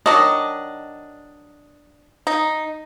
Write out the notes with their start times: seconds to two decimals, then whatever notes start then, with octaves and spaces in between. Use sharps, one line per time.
0.06 D#3 F#3 D4 D#5
2.27 D#4